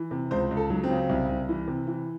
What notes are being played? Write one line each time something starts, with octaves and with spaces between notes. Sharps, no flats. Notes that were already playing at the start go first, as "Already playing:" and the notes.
Already playing: E3
C3
C#2 C5
C#2
A4
F#3
C4
C#3
C2
C2
E3
C3
E3